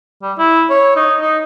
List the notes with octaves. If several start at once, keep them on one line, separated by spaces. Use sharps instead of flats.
G3
E4
C#5
D#4
D#4